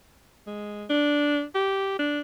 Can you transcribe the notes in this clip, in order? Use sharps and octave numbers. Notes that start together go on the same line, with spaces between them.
G#3
D4
G4
D4